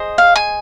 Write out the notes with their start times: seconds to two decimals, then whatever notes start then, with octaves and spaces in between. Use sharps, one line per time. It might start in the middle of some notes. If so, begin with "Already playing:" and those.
Already playing: G#4 C5 D#5
0.18 F5
0.36 G#5